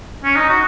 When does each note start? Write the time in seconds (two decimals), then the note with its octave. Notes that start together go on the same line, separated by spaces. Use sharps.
0.24 C#4
0.36 D#4
0.49 F#4